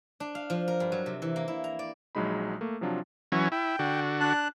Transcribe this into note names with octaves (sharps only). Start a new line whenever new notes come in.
D4
F5
F3
A#4
G2
F#3
C3
E3
A#3
E4
A#5
D5
A#1 F#3 G#3 D#4 B5
A3 A#3
C3 F3 F#3 D4 F4
E3 F#3 C#4
E4 G5
D3 F#4
D4 A5 F#6